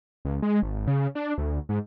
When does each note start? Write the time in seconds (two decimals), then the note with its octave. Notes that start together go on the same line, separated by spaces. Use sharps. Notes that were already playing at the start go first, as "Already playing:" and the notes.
0.25 C#2
0.42 G#3
0.63 G#1
0.87 C#3
1.15 D4
1.38 D2
1.69 G#2